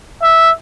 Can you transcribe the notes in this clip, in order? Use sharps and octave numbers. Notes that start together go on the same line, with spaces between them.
E5